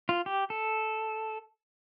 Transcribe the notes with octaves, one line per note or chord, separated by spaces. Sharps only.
F4
G4
A4